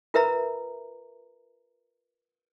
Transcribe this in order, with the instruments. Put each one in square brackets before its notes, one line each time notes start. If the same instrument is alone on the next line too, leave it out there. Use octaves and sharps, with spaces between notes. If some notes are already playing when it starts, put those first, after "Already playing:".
[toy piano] F4 A#4 B4 E5 A#5 B5